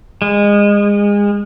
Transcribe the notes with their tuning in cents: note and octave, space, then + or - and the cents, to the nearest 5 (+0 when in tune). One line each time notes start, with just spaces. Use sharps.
G#3 -25